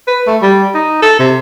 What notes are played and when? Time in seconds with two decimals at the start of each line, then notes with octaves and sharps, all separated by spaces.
0.08 B4
0.27 A3
0.43 G3
0.75 D#4
1.02 A4
1.20 C3